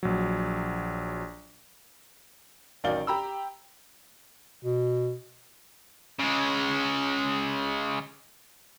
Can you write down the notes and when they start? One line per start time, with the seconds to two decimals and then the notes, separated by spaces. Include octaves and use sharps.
0.03 A#1 F#3
2.84 A1 D#3 F#3 D5 F5 G7
3.07 G4 A#5 B5 E6
4.63 B2
6.19 C#3 G#3